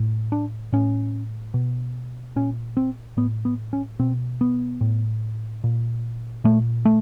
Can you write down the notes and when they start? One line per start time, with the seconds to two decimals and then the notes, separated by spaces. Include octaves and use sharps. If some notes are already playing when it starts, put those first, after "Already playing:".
Already playing: A2
0.32 D4
0.72 A2 C#4
1.54 B2
2.36 A#2 C#4
2.77 C4
3.17 A2 B3
3.45 B3
3.73 C#4
3.99 B2 C4
4.41 B3
4.81 A2
5.64 A#2
6.44 A#2 A3
6.85 A3